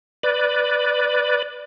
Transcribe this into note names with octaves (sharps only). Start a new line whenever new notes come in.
B4 D5